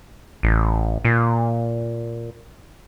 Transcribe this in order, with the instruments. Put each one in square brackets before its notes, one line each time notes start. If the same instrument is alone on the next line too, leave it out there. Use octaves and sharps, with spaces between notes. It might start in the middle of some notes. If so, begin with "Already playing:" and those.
[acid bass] A1
A#2